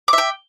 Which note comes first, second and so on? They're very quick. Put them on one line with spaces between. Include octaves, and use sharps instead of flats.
D6 E5 G5